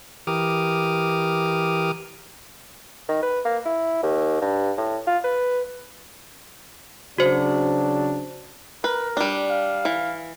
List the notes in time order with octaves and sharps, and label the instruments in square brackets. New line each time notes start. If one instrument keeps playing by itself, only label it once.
[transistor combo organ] E3 G4 A#4 D6 D#6 F6
[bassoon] D#3
B4
A#3
E4
D#2
G2
A2
F4
B4
[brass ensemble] C#3 F#3 D4 [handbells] F#4 C5
[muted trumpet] A#4 [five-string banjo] B4
[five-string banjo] G3 D4
[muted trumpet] F5
[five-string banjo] E3